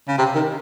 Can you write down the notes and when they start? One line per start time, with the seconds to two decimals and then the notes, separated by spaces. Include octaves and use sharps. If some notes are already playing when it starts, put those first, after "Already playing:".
0.08 C#3
0.18 C3
0.35 D#3